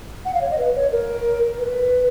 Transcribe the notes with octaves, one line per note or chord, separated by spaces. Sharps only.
F#5
F5
C#5
D#5
B4
C#5
A#4
B4